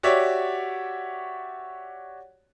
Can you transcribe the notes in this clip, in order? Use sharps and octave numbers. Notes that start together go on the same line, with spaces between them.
F#4 G4 C#5 D5 E5